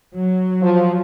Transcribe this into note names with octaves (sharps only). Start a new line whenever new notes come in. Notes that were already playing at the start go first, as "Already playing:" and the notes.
F#3
F3